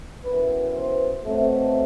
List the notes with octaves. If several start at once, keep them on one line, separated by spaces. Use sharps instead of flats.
F#2 E3 B3 B4
C5
B2 F#3 A3 C4